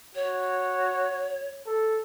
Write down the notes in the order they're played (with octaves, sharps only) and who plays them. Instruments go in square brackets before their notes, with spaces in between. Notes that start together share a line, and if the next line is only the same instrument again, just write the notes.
[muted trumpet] F#4 [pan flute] C#5
[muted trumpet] A4